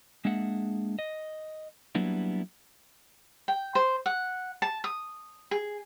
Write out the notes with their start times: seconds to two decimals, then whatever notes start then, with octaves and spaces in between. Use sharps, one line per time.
0.25 G#3 A#3 D4 G#4 E5 F#5
0.99 D#5
1.95 F#3 G3 A#3 B3 D4 E4
3.48 G5
3.75 C5
4.06 F#5
4.62 A5
4.84 D#6
5.51 G#4